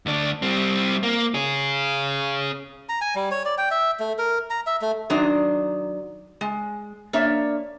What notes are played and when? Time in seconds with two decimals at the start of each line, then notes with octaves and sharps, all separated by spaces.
0.06 D2 D4
0.42 G3 C4
1.03 A#3
1.34 C#4 G#4
2.89 A#5
3.01 G#5
3.15 G3
3.31 C#5
3.45 D5
3.58 G5
3.71 E5
4.00 A3
4.19 A#4
4.50 A#5
4.67 E5
4.82 A3
5.10 D#3 F#3 D4 C5 D#5
6.41 G#3
7.13 A#3 D4 C#5 E5